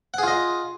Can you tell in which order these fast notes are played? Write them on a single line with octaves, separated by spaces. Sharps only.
F#5 G#4 F4 D#5